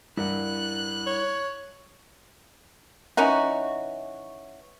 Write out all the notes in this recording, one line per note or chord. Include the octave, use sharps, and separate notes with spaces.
G2 E4 A#4 F#5 F#6
C#5
E3 C#4 D#4 F#4